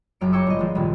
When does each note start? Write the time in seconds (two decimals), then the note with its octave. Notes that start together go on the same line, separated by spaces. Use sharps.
0.21 F#1 F#2 F6 D7
0.33 G5 G#5 A#5 C#6 D6 E6
0.47 G1 D#5
0.59 F3 G#3
0.75 D#1 C2